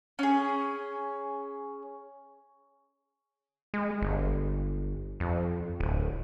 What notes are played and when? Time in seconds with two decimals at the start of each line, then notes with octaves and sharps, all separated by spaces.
0.19 C#4 G#4
3.74 G#3
4.01 G1
5.20 F2
5.80 D1